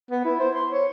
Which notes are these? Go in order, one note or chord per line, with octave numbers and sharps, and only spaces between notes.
B3
E4
C5
C6
C#5